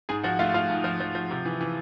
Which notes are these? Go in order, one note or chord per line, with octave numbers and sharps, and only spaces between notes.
G#2 G#4 G#5
F3 F#4 F#5
A3 F4 F5
F3 F4 F5
G#2
F3
F3
F3
C3
E3
E3